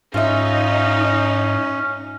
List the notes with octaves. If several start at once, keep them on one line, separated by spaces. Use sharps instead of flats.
G#2 C#4 D#4 F4 E5